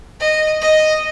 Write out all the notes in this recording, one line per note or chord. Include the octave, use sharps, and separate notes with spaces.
D#5
D#5